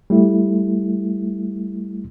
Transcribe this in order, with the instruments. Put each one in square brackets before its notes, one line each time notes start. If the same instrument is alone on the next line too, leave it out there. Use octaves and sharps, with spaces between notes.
[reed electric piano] G3 A3 E4